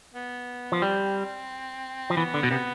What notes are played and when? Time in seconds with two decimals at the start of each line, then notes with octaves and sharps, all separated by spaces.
0.14 B3
0.72 F3
0.82 G3 C4
2.10 F3
2.17 E3 B3
2.34 D3
2.43 B2
2.51 C3 B3